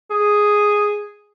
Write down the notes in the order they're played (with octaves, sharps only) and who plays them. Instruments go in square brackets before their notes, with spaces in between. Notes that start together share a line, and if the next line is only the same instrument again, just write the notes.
[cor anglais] G#4